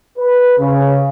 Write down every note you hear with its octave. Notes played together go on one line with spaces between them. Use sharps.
B4
C#3